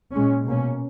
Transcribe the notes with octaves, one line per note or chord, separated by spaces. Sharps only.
A#2 G#3 C#4
B2 A#3 C#4